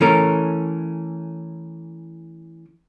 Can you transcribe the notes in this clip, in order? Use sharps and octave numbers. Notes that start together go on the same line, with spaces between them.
E3 A3 C#4 A4 A#4